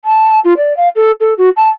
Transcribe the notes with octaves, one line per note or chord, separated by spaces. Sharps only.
A5
F4
D5
F5
A4
A4
F#4
A5